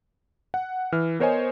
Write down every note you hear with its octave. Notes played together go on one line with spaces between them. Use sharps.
F#5
E3 F6
B3 A#4 C5 C#5 D#5 G#5